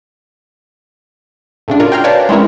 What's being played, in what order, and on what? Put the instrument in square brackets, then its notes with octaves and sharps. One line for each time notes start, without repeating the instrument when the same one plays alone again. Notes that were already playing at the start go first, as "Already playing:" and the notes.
[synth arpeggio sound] A2 C#3 D4
F4 F#4 A#4 C#5 D5
G5 G#5 A#5 C6 F6
A#4 B4 C#5 D5 F5 A5
G#3 C4 C#4 E4 A#4 C#5